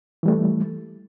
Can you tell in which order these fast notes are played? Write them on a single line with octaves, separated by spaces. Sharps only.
E3 G3 A3